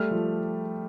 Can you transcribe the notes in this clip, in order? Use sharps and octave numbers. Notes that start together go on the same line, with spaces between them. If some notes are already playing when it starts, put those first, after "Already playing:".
Already playing: G3 A3 F6
F3